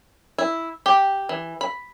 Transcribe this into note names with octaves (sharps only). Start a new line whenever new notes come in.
E4
G4
E3
B5